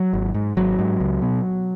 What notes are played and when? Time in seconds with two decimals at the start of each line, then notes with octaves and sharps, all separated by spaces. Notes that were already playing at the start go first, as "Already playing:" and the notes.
Already playing: F#3
0.13 G#1
0.34 G#2
0.57 G#1 F#3
0.79 G#2
1.00 C#2
1.22 B2